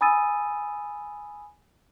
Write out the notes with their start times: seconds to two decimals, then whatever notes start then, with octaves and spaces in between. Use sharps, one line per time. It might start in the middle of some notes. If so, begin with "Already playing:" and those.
0.01 G#5 B5 D#6 E6 A6 D#7